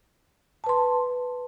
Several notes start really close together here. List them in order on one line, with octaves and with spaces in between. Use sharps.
A5 B4 C6